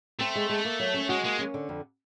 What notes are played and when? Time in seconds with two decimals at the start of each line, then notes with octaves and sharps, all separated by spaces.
0.20 A3 C4
0.35 G#3
0.50 G#3
0.65 A#3
0.80 F#3
0.94 C#4
1.09 G#3 F#4
1.24 G#3 A#3
1.39 C#4
1.54 D3
1.69 F2